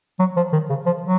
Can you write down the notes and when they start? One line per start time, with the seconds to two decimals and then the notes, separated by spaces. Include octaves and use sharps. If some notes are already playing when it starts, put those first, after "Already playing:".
0.19 F#3
0.36 F3
0.52 D#3
0.69 C#3
0.86 F3
1.02 F#3